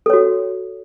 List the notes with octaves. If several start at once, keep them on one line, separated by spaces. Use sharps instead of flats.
F#4 A4 C#5